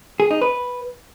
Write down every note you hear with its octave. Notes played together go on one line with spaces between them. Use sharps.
G#4
D#4
B4